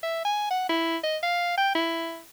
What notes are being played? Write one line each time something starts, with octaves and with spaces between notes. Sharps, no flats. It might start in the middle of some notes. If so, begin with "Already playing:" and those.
E5
G#5
F#5
E4
D#5
F5
G5
E4